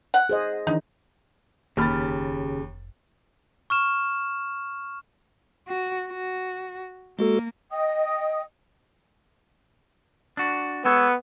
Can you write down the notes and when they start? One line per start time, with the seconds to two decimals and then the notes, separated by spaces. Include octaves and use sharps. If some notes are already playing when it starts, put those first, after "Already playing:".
0.14 F#5
0.29 G#4 C5 D#5
0.67 D#3 E3 D4 D#4
1.77 F1 D#2 C#3 G4 B5 F6 A6
3.70 C#6 F6 E7
5.68 F#4
6.08 F#4
7.19 G#3 A#3 F#4 A4
7.71 D#5 G5 D#6
10.37 D4 F#4
10.85 G#3 B3 A4 C#5